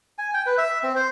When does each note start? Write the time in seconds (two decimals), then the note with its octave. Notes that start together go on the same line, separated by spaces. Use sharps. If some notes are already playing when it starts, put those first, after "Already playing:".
0.18 G#5
0.34 G5
0.46 B4
0.58 E5
0.83 C4
0.96 C5